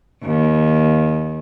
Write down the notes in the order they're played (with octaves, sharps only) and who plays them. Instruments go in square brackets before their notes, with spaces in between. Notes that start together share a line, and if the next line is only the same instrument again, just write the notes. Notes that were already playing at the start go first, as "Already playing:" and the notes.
[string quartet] D#2